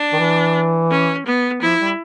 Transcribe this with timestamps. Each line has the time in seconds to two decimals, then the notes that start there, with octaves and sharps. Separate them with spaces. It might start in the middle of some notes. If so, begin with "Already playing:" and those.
Already playing: D4
0.13 D#3
0.19 E3
0.91 C#4
1.26 B3
1.62 F3 E4
1.80 G3